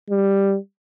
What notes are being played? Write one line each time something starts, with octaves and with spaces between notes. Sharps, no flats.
G3